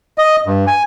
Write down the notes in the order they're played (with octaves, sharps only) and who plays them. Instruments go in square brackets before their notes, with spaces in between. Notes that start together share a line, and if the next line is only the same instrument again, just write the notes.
[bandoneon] D#5
G2
G#5